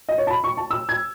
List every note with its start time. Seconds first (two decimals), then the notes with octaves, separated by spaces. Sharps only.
0.09 D#5
0.18 C#5
0.27 A5
0.30 B5
0.44 C#6
0.57 A5
0.71 E6
0.89 G#6